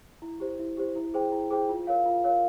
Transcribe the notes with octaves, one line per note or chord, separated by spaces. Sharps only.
E4
G4 C5
E4
G4 C5
E4
G#4 C5 G5
E4
G#4 C5 G5
F4
A#4 C#5 F5
F4
A#4 C#5 F5